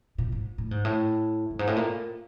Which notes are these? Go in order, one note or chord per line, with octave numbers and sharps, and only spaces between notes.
A#2
G#2
A2
G#2
A2
G2
G#2
A2
A#2